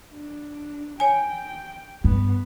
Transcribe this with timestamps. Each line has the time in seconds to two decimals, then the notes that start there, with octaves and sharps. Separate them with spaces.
0.15 D4
1.00 C#5 G5 G#5
2.04 G2 B3